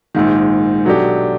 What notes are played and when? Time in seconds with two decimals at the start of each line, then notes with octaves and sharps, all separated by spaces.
0.15 A#1 G#2 D#3
0.85 B2 F#3 A3 D4 G4